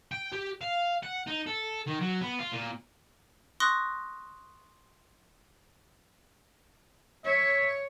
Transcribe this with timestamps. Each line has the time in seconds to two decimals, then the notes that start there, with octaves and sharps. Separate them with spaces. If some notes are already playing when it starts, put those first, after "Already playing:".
0.12 G5
0.33 G4
0.61 F5
1.03 F#5
1.27 D#4
1.46 A4
1.86 D#3
2.01 F#3
2.22 B3
2.39 F4
2.52 A#2
3.60 C6 C#6 D#6 F#6 A#6
7.25 C#5 E5